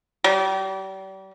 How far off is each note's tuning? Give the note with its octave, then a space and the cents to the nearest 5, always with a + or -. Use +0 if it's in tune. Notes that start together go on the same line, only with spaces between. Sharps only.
G3 -35